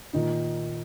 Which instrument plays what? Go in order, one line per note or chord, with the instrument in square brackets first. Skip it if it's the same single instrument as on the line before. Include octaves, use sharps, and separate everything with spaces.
[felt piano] A#2 [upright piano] D#3 D#4